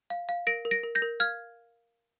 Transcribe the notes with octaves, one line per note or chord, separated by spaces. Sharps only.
F5
F5
A#4 A#6 D7
A#4
A#6 D7
A#4
G6 A#6
A#4
F5 F6 G#6